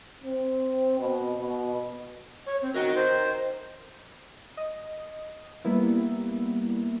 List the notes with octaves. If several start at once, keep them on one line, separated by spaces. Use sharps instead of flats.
C4
B2
B2
C#5
C4
F#4 A#4 D#5 G5
C5
D#5
G3 A#3 B3 E4